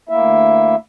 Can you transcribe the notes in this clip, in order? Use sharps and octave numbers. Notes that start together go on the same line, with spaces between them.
D2 A#3 E4 E5